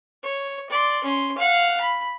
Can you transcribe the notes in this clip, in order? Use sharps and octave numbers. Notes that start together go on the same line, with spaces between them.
C#5
D5 C6
C#4 C6
F5 F#5
B5